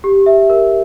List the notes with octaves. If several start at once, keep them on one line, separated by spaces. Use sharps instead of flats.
G4
E5
A#4